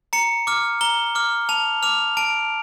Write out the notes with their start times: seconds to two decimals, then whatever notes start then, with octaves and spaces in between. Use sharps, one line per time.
0.13 A#5 C#7
0.47 D6 F6
0.81 A#5 G7
1.15 D6 F6
1.49 A5 F7
1.83 D6 F6 F7
2.17 A5 D7